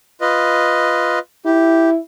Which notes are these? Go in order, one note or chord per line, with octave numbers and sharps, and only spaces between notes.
F4 B4 D#5
E4 G4